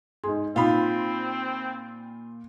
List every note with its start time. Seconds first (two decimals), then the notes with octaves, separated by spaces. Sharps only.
0.24 G#2 G#4 C6
0.56 A#2 C4 D#4 F4 F5 B5